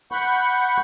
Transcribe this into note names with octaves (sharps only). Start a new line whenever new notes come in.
F#5 B5 C#6 G6